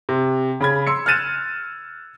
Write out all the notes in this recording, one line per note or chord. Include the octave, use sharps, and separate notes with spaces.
C3
C#3 B5 G#6
C6 E6 C#7
F6 F#6 A6 D#7 E7